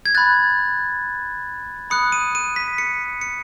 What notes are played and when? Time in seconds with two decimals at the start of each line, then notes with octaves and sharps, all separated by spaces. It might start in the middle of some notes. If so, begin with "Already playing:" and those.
0.06 G#6
0.15 B5 F#6 A6
1.90 B5 D#6 F#6 C#7
2.12 D#7
2.35 D#7
2.56 B6
2.78 C#7
3.21 C#7